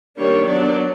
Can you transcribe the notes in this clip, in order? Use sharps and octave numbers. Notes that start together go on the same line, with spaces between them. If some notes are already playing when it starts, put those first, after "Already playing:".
D#3 G3 A#3 D4 C#5
F#3 B3 D4 D5